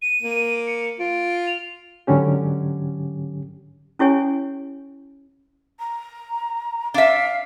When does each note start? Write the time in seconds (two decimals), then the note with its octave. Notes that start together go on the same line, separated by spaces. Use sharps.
0.02 D#7
0.22 A#3
0.67 C#7
0.99 F4 D7
1.47 F7
2.07 G#2 D3 F#3 C#4 G4
3.99 C#4 E4 G4 C#5 G#5
5.79 A#5
6.94 D4 E5 F5